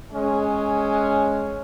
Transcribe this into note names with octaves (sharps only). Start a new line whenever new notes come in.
G#3 C#4